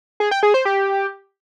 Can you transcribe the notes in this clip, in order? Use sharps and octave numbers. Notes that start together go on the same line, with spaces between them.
G#4
G5
G#4
C5
G4